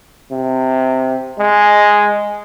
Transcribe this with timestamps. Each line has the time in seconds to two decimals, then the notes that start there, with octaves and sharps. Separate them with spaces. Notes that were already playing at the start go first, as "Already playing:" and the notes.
0.32 C3
1.39 G#3